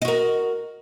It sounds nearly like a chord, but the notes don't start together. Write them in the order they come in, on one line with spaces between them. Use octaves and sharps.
D#5 F#4 A#4